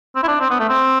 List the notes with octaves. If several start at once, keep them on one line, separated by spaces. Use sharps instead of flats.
C4
E4
D4
C4
B3
A3
C4